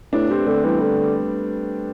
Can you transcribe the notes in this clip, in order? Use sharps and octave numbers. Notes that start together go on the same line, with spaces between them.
A2 B3 D4
C3 A3 C4
D3 A3 C4
E3 G3 B3
D3